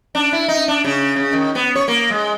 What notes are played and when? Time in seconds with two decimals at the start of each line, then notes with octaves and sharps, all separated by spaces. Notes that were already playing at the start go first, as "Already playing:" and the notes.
0.15 D4
0.33 E4
0.48 D#4
0.68 D4
0.85 C#3
1.16 C#3
1.33 D#3
1.55 B3
1.75 C#5
1.88 A#3
2.10 G#3